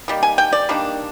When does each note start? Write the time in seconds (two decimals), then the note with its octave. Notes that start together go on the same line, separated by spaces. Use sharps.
0.08 D#3 G3 A#3
0.23 G#5
0.38 G5
0.53 D5
0.69 D#3 G3 A#3 D4